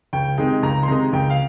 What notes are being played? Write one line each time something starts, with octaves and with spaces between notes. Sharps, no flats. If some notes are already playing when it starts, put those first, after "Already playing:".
C#2 G5
C3 D#3 G#3 D#4 G5
C#2 A#5
C6
C3 D#3 G#3 D#4 A#5
C#2 G5
F5